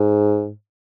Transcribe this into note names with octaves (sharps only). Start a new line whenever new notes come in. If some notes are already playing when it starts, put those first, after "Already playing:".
Already playing: G#2